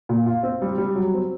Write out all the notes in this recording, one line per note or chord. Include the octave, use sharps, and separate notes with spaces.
A#2
F4
C4
G3
G3
F#3
C4